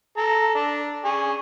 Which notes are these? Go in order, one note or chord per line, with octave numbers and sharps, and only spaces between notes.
A4 A#5
D4
G#4 G#5 C#6